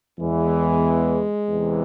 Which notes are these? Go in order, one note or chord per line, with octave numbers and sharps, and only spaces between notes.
E2 E3 G#3
E2 C3 E3